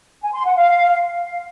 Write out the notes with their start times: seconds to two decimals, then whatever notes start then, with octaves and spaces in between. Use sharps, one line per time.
0.23 G#5
0.34 C6
0.46 F#5
0.57 F5